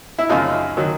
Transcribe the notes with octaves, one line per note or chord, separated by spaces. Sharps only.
E4
F#2 C#3 F3 D#4 F4
D#3 F#3